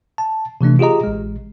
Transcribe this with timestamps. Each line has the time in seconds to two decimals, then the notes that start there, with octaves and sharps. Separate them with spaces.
0.18 A5
0.61 C3 E3 A3 D4
0.79 F4 G4 G#4 D#5 A#5
1.04 A1 G#3